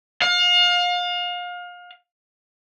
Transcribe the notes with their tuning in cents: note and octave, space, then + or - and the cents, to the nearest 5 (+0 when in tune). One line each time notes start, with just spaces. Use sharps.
F5 +30